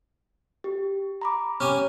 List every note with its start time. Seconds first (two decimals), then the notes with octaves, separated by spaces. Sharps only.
0.64 G4
1.21 A#5 B5 D6
1.60 C#4 G4 G#5 F6